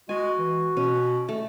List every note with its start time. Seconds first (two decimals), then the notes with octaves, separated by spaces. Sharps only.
0.09 G#3 F#4 G#5
0.38 E3
0.77 B2 C#4
1.29 A3